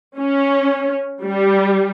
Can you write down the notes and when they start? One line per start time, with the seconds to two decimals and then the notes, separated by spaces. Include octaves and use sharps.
0.18 C#4
1.21 G3